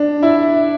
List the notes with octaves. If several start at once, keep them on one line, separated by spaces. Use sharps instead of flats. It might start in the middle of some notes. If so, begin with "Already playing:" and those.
Already playing: D4
E4